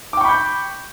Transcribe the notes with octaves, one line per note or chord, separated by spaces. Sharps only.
G5 B5 C#6 D6 G6